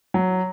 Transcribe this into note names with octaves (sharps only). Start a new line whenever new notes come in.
F#3